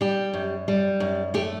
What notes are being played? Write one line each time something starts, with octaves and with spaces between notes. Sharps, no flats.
G3 G4
F#2
G3
F#2
A3 G4